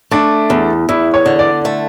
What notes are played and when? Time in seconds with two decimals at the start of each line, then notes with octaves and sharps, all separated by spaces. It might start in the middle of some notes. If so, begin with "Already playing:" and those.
0.11 A3 D4
0.50 E2
0.89 E2 E4
1.14 C#5
1.26 D3
1.39 D5
1.65 A3